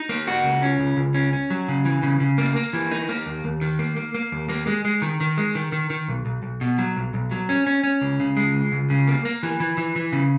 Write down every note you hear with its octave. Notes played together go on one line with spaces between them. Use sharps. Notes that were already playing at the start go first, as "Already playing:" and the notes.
Already playing: D#4
A#3
F#4
C#2
C#4
C#2
C#2
C#4
C#4
F#3
C#3
E3
C#3
C#3
A#3
A#3
E3
D#4
A#3
D#2
D#2
D#3
A#3
A#3
A#3
D#2
A#3
G#3
G#3
D#3
D#3
G#3
D#3
D#3
D#3
B1
B1
B1
B2
F#3
B1
B1
F#3
C#4
C#4
C#4
C#2
C#3
G#3
C#2
C#2
C#3
A#3
A#3
E3
E3
E3
E3
C#3